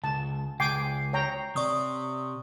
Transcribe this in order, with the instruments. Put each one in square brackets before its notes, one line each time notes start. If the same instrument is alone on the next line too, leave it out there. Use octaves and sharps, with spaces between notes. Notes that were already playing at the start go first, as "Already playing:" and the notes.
[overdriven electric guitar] C#2 [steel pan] A5
[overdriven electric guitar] C#2 [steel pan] G5 G#5 D6 [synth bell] C7
[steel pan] C#5 G5 A#5
[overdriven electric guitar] C3 [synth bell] D5 C#6 D#6